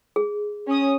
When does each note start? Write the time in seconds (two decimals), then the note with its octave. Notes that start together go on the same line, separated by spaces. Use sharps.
0.16 G#4
0.67 C#4 D#6